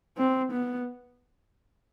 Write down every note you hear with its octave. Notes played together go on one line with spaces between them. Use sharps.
C4
B3